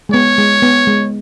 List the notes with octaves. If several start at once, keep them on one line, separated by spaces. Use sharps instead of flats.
G#3
B3 C#5
G#3
B3
G#3